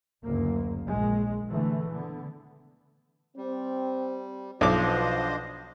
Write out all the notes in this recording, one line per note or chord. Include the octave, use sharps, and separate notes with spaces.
F#1 D2 A#3
A#1 G#3
D3 E3 A3
D3 B3
G3 C4
B1 B2 F3 D4 C5 D#5 D6